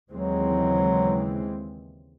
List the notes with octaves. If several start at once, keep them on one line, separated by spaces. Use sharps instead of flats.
D#2 C#3 E3 F#3 G#3 C4